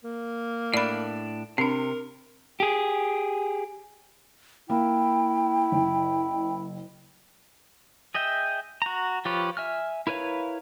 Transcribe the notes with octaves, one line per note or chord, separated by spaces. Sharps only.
A#3
A2 D4 D5 B5
C3 C4 D4 A#4
G4 G#4
A#3 E4 G5
F#1
G#4 D#5 E5 G5
F#4 A#5
F3 F4 G4 B4 C#5
E5 G#5 F6
E4 A#4 B4 C#5 F5